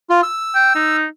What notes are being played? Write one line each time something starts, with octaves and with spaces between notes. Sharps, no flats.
F4
E6
G5
D#4